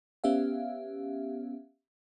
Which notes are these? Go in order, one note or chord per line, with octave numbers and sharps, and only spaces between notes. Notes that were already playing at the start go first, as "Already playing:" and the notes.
B3 C#4 G4 E5 F5